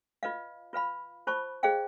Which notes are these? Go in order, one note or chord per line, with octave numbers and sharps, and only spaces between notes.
F4 B4 D#5 F5
F4 B4 F5 B5
F4 C5 A5 B5 C#6
G#4 C5 D#5 F5 G5